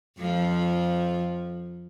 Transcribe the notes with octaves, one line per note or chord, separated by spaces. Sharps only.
F2 F3